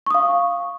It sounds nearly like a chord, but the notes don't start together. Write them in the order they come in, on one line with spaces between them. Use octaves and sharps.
C#6 D#6 F5